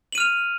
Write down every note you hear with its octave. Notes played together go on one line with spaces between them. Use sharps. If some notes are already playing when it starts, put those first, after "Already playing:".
F6 D#7 F7 F#7